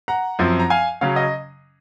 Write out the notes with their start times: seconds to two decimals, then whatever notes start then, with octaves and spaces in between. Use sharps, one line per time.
0.08 F#5 A#5
0.39 F#2 F3 C4
0.59 A#5
0.70 F5 G#5
1.01 C#3 F#3 C#4 F5
1.16 D#5